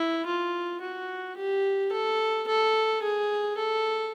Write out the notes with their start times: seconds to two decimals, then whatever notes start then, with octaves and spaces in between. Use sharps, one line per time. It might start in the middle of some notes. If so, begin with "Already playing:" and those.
Already playing: E4
0.26 F4
0.81 F#4
1.37 G4
1.92 A4
2.48 A4
3.02 G#4
3.57 A4